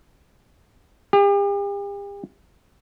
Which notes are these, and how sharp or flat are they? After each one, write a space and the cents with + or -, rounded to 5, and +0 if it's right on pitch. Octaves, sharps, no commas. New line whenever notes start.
G4 +40